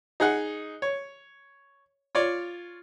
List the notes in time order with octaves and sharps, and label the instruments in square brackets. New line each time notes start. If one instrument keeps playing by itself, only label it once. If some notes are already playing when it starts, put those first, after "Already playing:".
[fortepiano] D#4 G#4 F#5
C#5
F4 C#5 D5